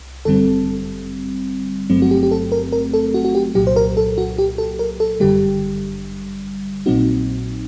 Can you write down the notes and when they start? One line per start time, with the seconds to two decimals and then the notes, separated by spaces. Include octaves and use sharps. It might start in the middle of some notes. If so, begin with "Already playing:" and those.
Already playing: C2
0.25 G1 F#2 D3 G3 C4 A4
1.90 G1 G2 F#3 A3 C4
2.02 F#4
2.11 G4
2.23 G4
2.31 A4
2.52 A#4
2.72 A#4
2.93 A4
3.14 F#4
3.25 F#4
3.35 G4
3.55 C2 A#2 F#3 G4
3.67 C5
3.76 A#4
3.97 A4
4.18 F#4
4.38 G4
4.58 A4
4.79 A#4
5.00 A4
5.20 G1 F#2 D3 G3 G4
6.86 A#1 A#2 F#3 C4 D#4 F#4